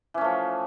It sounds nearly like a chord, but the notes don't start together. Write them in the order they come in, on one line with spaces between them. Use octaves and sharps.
E3 C#4 A3 F3